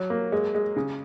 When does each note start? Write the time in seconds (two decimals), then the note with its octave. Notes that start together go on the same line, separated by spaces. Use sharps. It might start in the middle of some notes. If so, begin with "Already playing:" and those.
Already playing: F#3
0.10 A#3
0.32 G#3
0.55 G#3
0.76 C#3